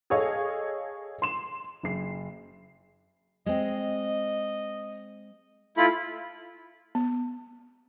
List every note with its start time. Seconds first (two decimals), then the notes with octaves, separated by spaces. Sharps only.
0.10 G#4 A4 C#5 D#5 F5
1.22 C6 E7
1.83 F#1 C7
3.46 G#3 C4 D#5
5.77 A3 E4 F4 B5
6.95 B3